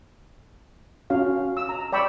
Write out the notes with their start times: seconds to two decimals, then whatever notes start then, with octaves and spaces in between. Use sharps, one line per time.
1.10 C#4 F#4 F5
1.57 E6
1.69 A#5
1.92 D5 G5 B5 C#6 E6